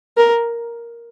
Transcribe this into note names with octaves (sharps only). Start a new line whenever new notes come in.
A#4